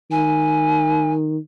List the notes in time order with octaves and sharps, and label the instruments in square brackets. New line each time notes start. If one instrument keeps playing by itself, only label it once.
[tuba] D#3 [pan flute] G#5